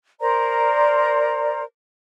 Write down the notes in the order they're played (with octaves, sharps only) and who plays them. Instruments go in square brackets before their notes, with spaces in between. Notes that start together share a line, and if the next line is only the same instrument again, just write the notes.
[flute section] A#4 C5 D5 A#5